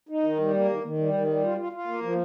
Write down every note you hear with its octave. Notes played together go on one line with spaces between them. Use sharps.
D#4
D#3
G3
A#3
D#3
D#3
G3
D#3
G3
F4
F4
F4
A#3
F3